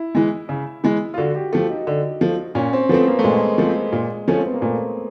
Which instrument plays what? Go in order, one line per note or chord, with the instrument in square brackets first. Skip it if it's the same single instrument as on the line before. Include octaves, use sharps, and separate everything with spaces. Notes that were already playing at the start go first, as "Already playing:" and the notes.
Already playing: [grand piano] E4
[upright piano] E3 G#3
C#3
E3 G#3
[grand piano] F4
[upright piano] D3 [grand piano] F#4
[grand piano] G4
[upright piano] F3 A3 [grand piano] G4
[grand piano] D#4
[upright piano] D3
F3 A3
[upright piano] A#2 [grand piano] C#4
[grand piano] C4
[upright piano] F3 A3 C4 [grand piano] B3
[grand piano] A#3
A3
[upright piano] A#2 [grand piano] G#3
[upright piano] F3 A3 C4
A#2
F3 A3 C#4
[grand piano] C4
B3
A#3
[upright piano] A#2 [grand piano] A3